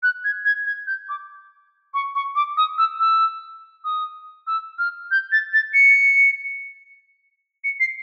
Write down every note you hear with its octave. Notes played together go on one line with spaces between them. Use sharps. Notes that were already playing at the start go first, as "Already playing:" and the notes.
F#6
G#6
G#6
G#6
G6
D6
C#6
C#6
D6
D#6
E6
E6
D#6
E6
F6
G6
A6
A6
C#7
C#7
C7